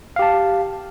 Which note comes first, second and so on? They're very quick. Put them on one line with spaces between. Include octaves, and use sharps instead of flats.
F5 G4 A5